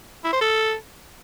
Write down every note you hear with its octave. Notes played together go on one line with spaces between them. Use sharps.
E4
C5
A4